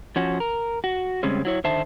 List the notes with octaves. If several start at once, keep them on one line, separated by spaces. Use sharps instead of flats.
F3 C#4 F#4
A#4
F#4
C#3 G3 G#3 C4 C#4
F#3 E4 C#5
D3 D#3 C5 E5 A5